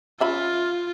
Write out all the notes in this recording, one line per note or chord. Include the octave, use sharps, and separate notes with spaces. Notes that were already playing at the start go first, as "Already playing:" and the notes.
C#4 F4 E5 B5